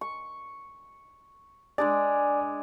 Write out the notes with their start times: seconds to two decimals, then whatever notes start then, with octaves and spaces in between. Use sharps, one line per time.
0.01 C#6
1.78 G#3 D4 G#4 D5